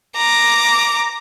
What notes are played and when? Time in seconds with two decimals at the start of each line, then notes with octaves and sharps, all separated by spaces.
0.16 A#5 D6